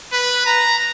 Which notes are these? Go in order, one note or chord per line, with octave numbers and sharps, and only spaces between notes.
B4
A#5